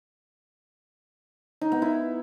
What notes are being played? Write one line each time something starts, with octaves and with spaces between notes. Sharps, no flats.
D#4
B3
E4